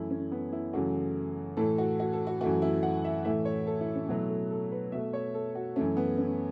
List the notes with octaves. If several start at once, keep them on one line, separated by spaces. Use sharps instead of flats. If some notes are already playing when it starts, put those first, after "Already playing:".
Already playing: F#2 E3 A3 E4
C#4
B3
E4
F#2 C#3 E3 A3 F#4
A2 E3 A3 A4
F#4
F#4
A4
F#4
F#2 E3 A3 F#4
E4
F#5
E5
A2 E3 A3 E5
C#5
A4
E4
C#4
B2 F#3 A3 E4
A4
A4
B4
B2 A3 E5
C#5
A4
F#4
F#2 E3 A3 C#4
B3
C#4